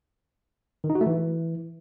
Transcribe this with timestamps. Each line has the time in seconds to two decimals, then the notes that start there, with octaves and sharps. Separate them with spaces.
0.84 D#3
0.90 D#4
0.95 F#4
1.01 A3
1.07 E3